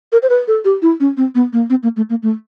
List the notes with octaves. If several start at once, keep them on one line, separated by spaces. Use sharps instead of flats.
A#4
C5
B4
A4
G4
E4
C#4
C4
B3
A#3
C4
A#3
A3
A#3
A3